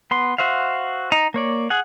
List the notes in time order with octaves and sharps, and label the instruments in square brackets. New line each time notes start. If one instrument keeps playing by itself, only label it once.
[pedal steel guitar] B3 C6
F#4 C5 E5 F5
D#4 A#5
A#3 C#5 D5
G#4 F#5